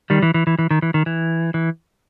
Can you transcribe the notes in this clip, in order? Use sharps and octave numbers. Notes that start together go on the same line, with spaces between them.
D#3 G3
E3
E3
E3
E3
D#3
E3
D#3
E3
E3